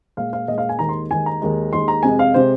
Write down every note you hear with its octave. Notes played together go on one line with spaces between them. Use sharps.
A#2 G#3 F5
F5
A#2 G#3 D#5
F5
G#5
D#2 D#3 G#3 A#5
C6
D#2 D#3 G#3 G#5
A#5
D#2 D#3 G#3
D#2 D#3 G#3 C6
A#5
F2 C3 G#3 G#5
F5
C3 G#3 C5